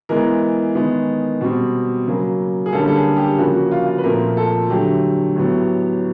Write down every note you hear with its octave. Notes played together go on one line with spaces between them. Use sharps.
E3 G#3 B3 A#4
D#3 G#3 B3
B2 G3 C4
C#3 F#3 A#3
G#4
D3 G3 A#3 C#4 A4
A4
G#4
G4
C#3 F3 A#3 C#4 F#4
F#4
F4
F4
B4
A#2 F3 A3 C4 A#4
A4
D3 F#3 A3 G4
A2 F#3 B3